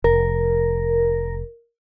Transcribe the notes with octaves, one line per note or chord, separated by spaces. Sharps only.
F1 A#4